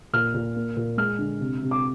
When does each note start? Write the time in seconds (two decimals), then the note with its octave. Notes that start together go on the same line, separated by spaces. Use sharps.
0.13 A#2 F6
0.34 A#2
0.56 A#3
0.77 A#2
0.97 G#3 F6
1.18 D3
1.40 C3
1.62 C3
1.71 D6